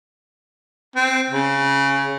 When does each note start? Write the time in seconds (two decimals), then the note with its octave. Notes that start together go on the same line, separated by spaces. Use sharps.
0.96 C4
1.30 C#3